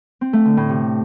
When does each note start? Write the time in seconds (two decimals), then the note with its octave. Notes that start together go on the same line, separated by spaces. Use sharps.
0.21 C4
0.33 A3
0.45 D3
0.57 A2
0.69 C3